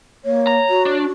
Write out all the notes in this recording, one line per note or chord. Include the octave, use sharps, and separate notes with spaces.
A#3 C#5
A#5
F#4
D4